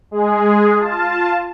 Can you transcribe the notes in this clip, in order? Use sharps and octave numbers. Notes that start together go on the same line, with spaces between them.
G#3 G#4
F4 A5